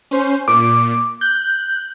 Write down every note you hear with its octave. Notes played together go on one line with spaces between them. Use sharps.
C#4 C5
A#2 D6
F#6 G6